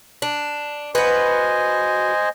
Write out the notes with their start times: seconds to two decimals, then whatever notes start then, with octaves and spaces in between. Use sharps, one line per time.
0.22 D4
0.95 F#4 B4 C5 D#5 G#5